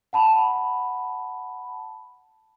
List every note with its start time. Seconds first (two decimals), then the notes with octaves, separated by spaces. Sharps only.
0.13 F#5 A5 B5